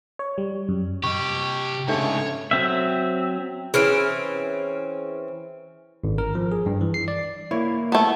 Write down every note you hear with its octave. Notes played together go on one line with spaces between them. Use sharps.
C#5
G3
F#2
C3 G4 D#5 C#6
G#2 C#3 A3 D4 C#5
F#3 C4 E5
E3 C4 C#4 G#4 F6 D7
G#1
A#4
F3
G#4
G2
E3
C7
D5
A#3 E4 C#5
A3 B3 A5